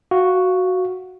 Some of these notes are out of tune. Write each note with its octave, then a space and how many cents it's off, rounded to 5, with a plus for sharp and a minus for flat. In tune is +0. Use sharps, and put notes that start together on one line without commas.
F#4 +0 F5 -5